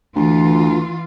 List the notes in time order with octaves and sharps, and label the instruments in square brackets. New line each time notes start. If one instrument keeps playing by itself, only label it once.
[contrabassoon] D2 [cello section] E3 F4